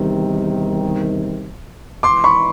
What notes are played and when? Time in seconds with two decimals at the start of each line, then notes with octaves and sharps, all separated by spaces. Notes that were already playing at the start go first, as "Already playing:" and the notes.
Already playing: E2 C3 D#3 G3
2.03 G#1 G#2 E3 C6 D6
2.24 B5 C#6